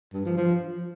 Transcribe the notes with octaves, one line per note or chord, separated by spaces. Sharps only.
G2
F3
F3